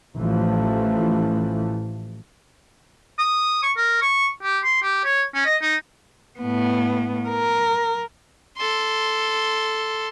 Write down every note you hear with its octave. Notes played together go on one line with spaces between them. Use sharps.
A1 E3 F3 A3
D#6
C#6
A#4
C#6
G4
C6
G4
C#5
C#4
D#5
D#4
A2 B3
A#4
A4 C6